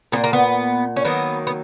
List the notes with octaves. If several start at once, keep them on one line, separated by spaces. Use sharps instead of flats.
A#2 A#3 B3
A#3
B3
C#4
D#3 F#3 A#3 B3
B3